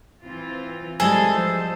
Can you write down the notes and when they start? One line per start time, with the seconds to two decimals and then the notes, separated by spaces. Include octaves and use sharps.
0.24 E3 C4 F4
1.00 E3 G3 G#3 C4 G#4 A4 G#5
1.31 F3 C5